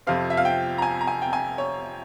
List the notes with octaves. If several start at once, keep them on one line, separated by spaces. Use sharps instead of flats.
F2 C3 F3 C4 F5
E5
F5
G5
A#5
G#5
A#5
G#5
G5
G#5
C#5